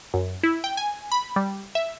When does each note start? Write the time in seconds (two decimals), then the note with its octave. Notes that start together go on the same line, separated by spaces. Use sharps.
0.14 F#2
0.43 E4
0.64 G5
0.77 G#5
1.12 B5
1.36 G3
1.75 E5